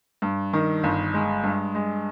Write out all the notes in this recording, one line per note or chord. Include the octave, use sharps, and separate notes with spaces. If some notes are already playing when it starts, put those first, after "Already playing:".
G2
D#3
G1
G#3
G2
G#3